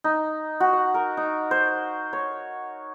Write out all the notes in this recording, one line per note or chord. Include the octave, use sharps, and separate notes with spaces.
D#4
F#4
F#5
A#4
D#4
C5
C#5